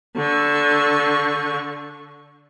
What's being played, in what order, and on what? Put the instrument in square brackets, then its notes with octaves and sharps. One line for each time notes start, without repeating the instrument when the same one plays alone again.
[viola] D3 C#6